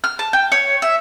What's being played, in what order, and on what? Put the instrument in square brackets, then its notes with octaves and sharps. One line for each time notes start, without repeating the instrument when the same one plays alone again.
[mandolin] F6
A5
G5
C#5
E5